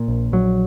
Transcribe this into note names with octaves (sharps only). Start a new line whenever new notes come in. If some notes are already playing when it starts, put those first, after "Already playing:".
Already playing: A#2
A#1
A#1 F#3